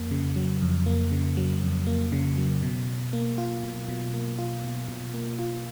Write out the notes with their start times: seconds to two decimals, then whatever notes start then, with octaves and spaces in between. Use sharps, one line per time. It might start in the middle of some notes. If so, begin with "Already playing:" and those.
Already playing: F2 A#3
0.11 C#3
0.36 F#3
0.62 F2
0.86 A#3
1.11 C#3
1.37 F#3
1.62 F2
1.87 A#3
2.12 C#3
2.38 F#3
2.62 B2
2.87 B2
3.13 A#3
3.38 F4
3.63 B2
3.88 B2
4.14 A#3
4.38 F4
4.64 B2
4.88 B2
5.14 A#3
5.39 F4